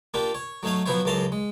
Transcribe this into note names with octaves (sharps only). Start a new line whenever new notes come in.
A#3 D4 F4 G4
C#5
F#3 A3 D#4 C#5 F5
F3 F#3 B3 E4 C5 C#5
C#2 F#2 C#3 A5 A#5 C6
G#3